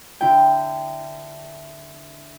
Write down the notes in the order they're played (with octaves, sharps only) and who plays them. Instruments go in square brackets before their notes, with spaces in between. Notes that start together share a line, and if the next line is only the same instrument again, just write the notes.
[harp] D3 E4 G5